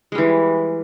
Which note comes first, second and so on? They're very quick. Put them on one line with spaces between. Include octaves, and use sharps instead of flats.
G#3 G3 E3